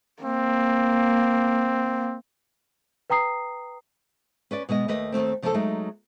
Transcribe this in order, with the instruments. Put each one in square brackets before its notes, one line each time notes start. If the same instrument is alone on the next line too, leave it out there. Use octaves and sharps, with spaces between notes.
[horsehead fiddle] A#3 [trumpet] C4
[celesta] B4 G5 A#5 D#6 C7
[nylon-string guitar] C#4 B4 D5
B2 G#3 B3 D#5
D#2 A3 B4 D#5
D#2 G#2 A3 C4
C#3 F3 A#3 C4 F4 A4
F#3 G#3 A3 D#4